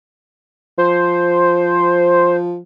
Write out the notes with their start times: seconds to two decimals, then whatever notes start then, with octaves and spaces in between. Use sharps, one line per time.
0.78 F3 C5